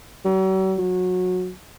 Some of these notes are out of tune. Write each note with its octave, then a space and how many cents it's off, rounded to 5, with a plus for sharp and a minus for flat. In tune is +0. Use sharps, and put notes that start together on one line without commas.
F#3 +45
F#3 -20